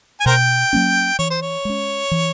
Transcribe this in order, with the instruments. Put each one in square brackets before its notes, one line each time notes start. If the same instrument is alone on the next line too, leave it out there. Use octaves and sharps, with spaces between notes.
[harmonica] G#5
[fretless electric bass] B2 [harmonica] A#4 C5 G5
[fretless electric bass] F#3 A#3 C#4
[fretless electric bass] E3 [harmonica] C#5
[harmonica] C5
C#5
[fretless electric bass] G#3 C#4
E3